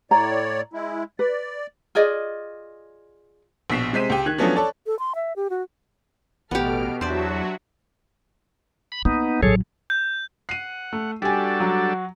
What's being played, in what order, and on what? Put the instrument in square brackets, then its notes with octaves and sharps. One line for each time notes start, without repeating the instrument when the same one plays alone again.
[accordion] A2 C#5 D5 [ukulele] A#5
[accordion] G#3 E4
[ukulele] B4 [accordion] D5
[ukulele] F4 G#4 D5 D#5
[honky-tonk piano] A#1 B2 B6 C7 E7
C3 G#3 C5 B6 D#7 E7
C#2 G4
D#3 F#6 G#6
F3 F#3 A3 B3 C#4 D4
A4 C#5 D5 A5
[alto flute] A4
C6
E5
G4
F#4
[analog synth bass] A1 [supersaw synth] B2 [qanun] B3 G4 [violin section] A4 F6 D7
[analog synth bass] E2 [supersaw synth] F#3 F#4 [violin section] D4 E5 A5 [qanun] C5 D5
[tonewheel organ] B5
[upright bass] A#3 [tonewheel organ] B3 D#4
[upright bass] A1 F#3 [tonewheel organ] G#4 A4 C#5
[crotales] G6
[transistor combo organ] F#5 [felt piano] C7 D#7
[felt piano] A3
[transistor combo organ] G3 D4 A4 [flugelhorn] F#4 [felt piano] G4 G#5
[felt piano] F#3